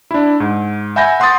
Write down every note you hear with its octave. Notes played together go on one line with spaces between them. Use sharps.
D4 E4
G#2
E5 F#5 G#5 B5 G6 A#6
F#5 C6 D6 D#6 A6